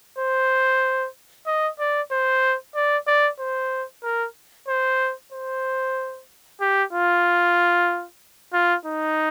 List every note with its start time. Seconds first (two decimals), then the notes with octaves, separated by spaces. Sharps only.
0.18 C5
1.47 D#5
1.79 D5
2.11 C5
2.75 D5
3.07 D5
3.39 C5
4.04 A#4
4.68 C5
5.32 C5
6.61 G4
6.93 F4
8.53 F4
8.85 D#4